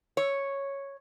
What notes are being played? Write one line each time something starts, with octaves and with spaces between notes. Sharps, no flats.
C#5